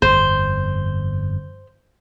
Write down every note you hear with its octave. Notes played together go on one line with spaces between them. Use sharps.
G1 F2 C5